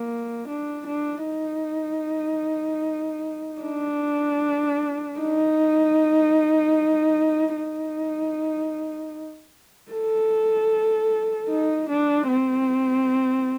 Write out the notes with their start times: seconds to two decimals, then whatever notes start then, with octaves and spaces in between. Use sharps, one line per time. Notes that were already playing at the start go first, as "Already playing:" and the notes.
Already playing: A#3
0.48 D4
0.87 D4
1.25 D#4
3.62 D4
5.20 D#4
7.56 D#4
9.92 A4
11.49 D#4
11.89 D4
12.29 C4